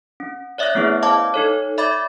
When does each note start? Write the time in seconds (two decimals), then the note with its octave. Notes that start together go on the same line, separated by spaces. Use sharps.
0.20 C#4
0.58 C#5 D5 E5 D#6 F#6 A#6
0.75 A3 B3 C#4 E4 G#4 B4
1.02 C5 D5 D#5 F5 A5 D6
1.34 D#4 A4 C#5
1.78 D5 E5 B5 D6 G#6 A6